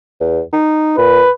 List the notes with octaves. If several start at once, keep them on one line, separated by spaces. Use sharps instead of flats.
E2
D#4
A#2 B4